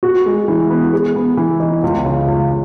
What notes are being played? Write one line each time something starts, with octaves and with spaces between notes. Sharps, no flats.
F#4
G#3
E3
B3
G#4
B3
E3
D#4
C#2
C#3
C#2